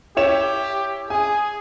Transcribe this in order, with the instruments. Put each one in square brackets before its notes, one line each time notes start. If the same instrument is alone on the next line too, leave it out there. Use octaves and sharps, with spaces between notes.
[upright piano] E4 C#5 E7 [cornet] G4
[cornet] G#4 [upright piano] G#5